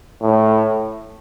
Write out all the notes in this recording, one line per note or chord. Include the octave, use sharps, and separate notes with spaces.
A2